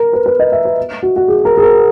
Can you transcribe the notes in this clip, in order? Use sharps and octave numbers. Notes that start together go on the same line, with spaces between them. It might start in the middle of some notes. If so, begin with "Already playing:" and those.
Already playing: A#4
B4
B4
D#5
E5
B4
F#4
F#4
G#4
A#4
G#4
A#4